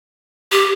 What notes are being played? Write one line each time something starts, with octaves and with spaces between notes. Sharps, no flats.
G4